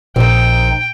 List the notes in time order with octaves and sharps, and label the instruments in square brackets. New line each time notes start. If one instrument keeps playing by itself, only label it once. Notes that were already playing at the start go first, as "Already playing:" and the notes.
[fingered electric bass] A#1 [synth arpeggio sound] A#2 [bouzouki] C4 D#4 [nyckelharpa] G5